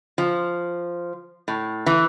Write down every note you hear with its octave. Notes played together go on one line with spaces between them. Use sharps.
F3
A2
E3